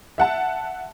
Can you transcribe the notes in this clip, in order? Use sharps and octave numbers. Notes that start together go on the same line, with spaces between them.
E5 F#5 A5